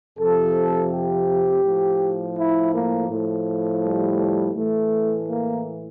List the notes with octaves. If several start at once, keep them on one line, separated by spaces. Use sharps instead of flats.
F2 C3 F3 A4
G4
A2 F3
E4
A#3
A2 F3
G3
A2 E3 A3
A#3